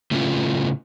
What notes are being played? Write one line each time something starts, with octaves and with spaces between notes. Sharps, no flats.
A2 C#3 A3 C#4 E4 F4